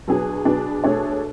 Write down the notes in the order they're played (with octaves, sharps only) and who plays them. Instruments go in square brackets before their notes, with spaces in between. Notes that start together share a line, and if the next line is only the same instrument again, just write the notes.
[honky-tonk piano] B2 F#3 B3 D4 G#4
B2 F#3 B3 D4 G#4
B2 A3 D4 G#4 C#5